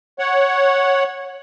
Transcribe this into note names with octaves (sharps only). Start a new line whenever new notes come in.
C#5 F#5